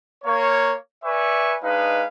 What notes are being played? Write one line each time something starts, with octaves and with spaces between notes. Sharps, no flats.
A#3 C#5
B4 D5 E5 G#5 C#6
G#3 D4 D#4 B4 F5